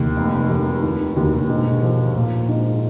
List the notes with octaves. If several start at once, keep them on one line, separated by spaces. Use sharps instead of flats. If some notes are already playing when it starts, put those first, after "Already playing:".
Already playing: D#2 C3
F1
F1
D#3
D#2
G#2 B2
F3
A#2 A#3
G#2